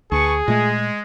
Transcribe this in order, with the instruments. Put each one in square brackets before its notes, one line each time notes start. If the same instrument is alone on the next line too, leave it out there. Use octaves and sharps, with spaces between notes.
[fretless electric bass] D2 [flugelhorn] G#4 [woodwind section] B4 A5 C#6
[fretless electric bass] A#2 A3 [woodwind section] G#3